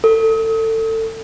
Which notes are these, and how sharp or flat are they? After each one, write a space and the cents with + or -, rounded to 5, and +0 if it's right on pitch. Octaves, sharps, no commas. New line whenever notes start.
A4 +25